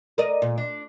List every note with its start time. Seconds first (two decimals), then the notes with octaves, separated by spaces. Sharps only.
0.18 A#4 D5 D#5
0.42 A#2
0.58 D4